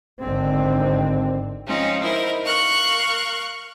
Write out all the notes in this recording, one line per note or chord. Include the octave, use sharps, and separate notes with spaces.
G#1 D3 C4
F3 G#3 C4 C#4 D#4 F4
D#4 E4 A#4 C5
A#4 F5 C#6 F#6